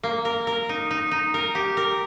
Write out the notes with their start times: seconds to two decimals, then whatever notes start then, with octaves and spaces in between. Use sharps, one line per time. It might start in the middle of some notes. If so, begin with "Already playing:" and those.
0.03 A#3
0.25 A#4
0.47 A#4
0.69 D#4
0.91 D#4
1.11 D#4
1.34 A#4
1.55 G4
1.77 A#4